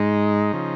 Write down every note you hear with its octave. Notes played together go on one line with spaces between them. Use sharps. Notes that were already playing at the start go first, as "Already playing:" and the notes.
Already playing: G#2 G#3 D#4
C#3 F3